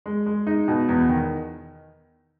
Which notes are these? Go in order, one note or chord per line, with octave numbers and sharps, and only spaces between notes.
G#3
G#3
D#4
B2
E2
D#3